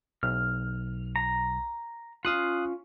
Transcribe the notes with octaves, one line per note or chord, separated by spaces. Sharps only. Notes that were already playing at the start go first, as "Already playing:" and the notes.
B1 F6
A#5
C#4 F4 F5 D#6 F#6